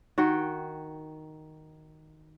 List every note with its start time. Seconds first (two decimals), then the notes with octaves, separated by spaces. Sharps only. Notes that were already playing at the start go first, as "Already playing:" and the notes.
0.18 D#3 F#4 G5